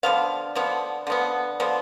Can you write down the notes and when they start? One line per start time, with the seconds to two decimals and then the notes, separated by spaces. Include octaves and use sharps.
0.03 D3 F3 B3 F5
0.55 D3 F3 B3
1.07 D3 F3 B3
1.60 D3 F3 B3